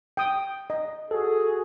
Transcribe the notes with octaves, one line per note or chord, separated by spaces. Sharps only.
G5 D#6
D#5
F#4 G#4 A4